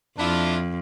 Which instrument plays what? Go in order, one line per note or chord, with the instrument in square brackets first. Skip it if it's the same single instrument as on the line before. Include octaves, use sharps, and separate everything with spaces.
[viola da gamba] F2 [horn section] D4 E4 F4